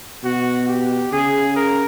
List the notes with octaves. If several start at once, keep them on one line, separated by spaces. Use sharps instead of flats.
B2 F#4
G4
C#3 G#4
A#4